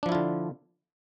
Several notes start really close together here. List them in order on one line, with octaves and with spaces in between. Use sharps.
D4 F3 E4 F4 D3